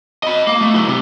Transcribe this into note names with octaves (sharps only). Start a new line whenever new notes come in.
D#5 B5
A#3
A3
F#3 E4
C3